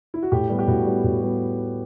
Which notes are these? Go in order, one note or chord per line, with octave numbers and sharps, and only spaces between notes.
E4
F#4
A2 G4
G3 B3
G4
A2 F#4
G3 B3
A2 F#4
G3 B3